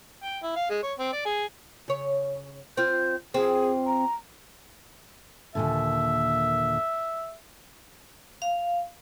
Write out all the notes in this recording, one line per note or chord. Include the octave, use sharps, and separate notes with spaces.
G5
E4
F5
G#3
C#5
C4
D5
G#4
C#3 C#5
C4 F4 G6
F2 C4 G#4
A#5
D#2 A#2 D3 E5
F5